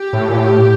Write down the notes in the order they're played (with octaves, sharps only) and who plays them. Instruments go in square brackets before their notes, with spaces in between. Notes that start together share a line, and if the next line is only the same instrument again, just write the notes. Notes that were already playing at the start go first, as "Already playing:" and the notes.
Already playing: [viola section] G4
[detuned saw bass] A2
A#2
A2